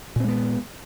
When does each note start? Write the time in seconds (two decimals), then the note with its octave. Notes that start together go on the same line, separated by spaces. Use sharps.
0.16 A#2
0.20 C4
0.24 G#3
0.28 B3